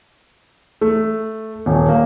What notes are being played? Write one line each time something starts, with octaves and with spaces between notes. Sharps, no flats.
A3
D#1
A#3